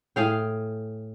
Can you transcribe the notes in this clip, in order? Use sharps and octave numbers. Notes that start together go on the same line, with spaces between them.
A2 G#4 F5 G5